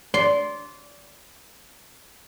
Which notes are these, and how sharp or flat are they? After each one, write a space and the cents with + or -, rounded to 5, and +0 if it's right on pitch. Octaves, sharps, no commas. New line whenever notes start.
D5 -25 C6 +0